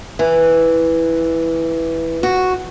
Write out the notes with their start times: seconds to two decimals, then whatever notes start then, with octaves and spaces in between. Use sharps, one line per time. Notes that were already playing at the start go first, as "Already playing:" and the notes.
0.19 E3
2.23 F#4